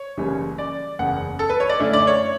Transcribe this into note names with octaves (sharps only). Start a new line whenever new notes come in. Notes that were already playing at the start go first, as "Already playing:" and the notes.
Already playing: C#5
F#1 F#2 C#3 E3 G3
D5
F#1 E2 C#3 F#5
A4
B4
C#5
D5
F#2 D3 A3 C#4 E4
D5
C#5